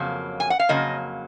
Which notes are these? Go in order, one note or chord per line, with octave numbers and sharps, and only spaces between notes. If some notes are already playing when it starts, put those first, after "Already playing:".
Already playing: F2 C#3 F#3 A#3
G#5
F#5
F5
F2 C#3 F#3 A#3 D#5